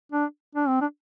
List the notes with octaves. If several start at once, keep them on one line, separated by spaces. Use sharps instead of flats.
D4
D4
C4
D4